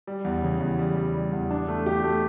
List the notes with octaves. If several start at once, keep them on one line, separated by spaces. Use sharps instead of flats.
G3
E2
C#3
E2
G3
G3
G3
E2
D4
A3
G4
A3